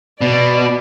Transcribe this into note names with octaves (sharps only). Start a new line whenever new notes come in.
B2 D5